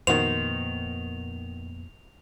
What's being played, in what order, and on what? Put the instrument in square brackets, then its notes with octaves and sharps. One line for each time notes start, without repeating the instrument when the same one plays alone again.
[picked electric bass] F2 A#2 B3 [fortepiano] D#3 F#4 C5 [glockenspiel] F7